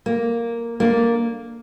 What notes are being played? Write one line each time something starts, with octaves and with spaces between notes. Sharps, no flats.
A#3
A#3 D4